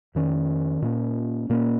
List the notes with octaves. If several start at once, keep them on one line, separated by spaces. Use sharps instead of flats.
F2 D#3 C#4
A#2 A#3 C#4
A#2 A#3 C#4